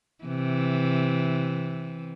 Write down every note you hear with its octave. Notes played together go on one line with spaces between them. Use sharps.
C3 E3